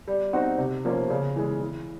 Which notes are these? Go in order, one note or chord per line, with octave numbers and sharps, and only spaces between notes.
G3
C4 D#4 F#4
C3
F3 A#3 C#4 F4
C#3
E3 G#3
E3